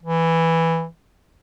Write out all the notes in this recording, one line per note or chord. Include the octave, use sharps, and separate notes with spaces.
E3